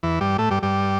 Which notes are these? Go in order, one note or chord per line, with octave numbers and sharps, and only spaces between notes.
E2 E3
G2 G3
A2 A3
G2 G3
G2 G3